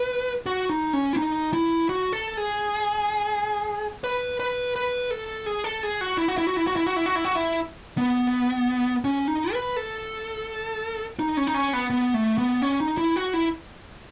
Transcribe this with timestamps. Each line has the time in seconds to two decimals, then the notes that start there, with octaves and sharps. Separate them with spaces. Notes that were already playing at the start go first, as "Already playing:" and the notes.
Already playing: B4
0.46 F#4
0.70 D#4
0.93 C#4
1.13 E4
1.17 D#4
1.53 E4
1.89 F#4
2.13 A4
2.37 G#4
4.04 B4
4.40 B4
4.76 B4
5.11 A4
5.46 G#4
5.64 A4
5.83 G#4
6.01 F#4
6.18 E4
6.28 F#4
6.38 E4
6.47 F#4
6.57 E4
6.67 F#4
6.76 E4
6.86 F#4
6.96 E4
7.06 F#4
7.15 E4
7.25 F#4
7.35 E4
7.98 B3
9.04 C#4
9.28 D#4
9.53 B4
9.76 A4
11.19 D#4
11.37 C#4
11.47 D#4
11.54 C#4
11.73 B3
11.90 B3
12.14 A3
12.38 B3
12.62 C#4
12.80 D#4
12.98 E4
13.16 F#4
13.33 E4